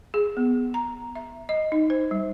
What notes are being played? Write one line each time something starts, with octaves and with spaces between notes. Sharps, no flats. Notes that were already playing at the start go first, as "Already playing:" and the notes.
G#4
B3
A#5
E5
D#5
D#4
C5
G3